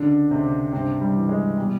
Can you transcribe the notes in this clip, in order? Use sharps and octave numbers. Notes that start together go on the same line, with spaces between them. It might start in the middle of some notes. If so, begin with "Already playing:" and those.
Already playing: C#2 D3 D4
C#2 C3 C4
G2 C3 C4
G3
E3
G#3
B2 G3